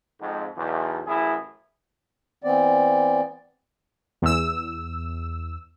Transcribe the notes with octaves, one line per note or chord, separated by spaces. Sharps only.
F2 G#2
B1 E2
A1 F#2 E4 G#4
E3 B3 C4 D5
E2 E6